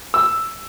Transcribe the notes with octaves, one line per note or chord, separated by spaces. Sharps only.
E6